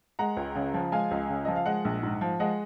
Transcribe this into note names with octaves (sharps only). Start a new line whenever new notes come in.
G#3 F#5 A#5
C#2
C#3
F3
G#3 F5 G#5
C#2
C#3
F3 D#5
F5
G#3 D#5 F#5
A#1
G#2
F3
G#3 D#5 F#5